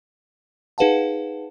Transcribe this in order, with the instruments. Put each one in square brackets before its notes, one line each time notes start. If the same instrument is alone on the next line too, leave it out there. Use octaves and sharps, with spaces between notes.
[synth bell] D#4 G#4 B4 F5 F#5 A5